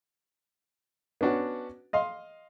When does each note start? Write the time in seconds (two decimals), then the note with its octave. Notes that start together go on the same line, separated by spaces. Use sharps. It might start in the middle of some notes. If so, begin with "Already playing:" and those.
1.21 B3 C#4 D4 F#4
1.93 D#5 F5 C6